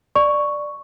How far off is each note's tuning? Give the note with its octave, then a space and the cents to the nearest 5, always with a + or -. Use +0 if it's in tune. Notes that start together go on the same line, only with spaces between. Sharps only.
D5 +10 C#6 +0